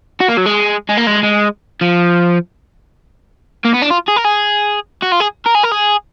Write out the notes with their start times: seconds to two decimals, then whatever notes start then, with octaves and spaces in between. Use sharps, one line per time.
0.21 F#4
0.29 A#3
0.37 F#3
0.46 G#3
0.89 G#3
0.98 A#3
1.07 G#3
1.23 G#3
1.81 F3
3.65 A#3
3.74 B3
3.82 D4
3.91 F4
4.08 G#4
4.17 A#4
4.25 G#4
5.02 F#4
5.12 F4
5.20 G#4
5.46 A#4
5.55 G#4
5.63 A#4
5.71 G#4